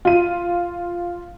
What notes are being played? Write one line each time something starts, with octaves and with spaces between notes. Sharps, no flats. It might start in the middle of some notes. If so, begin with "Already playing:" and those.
F4 D#7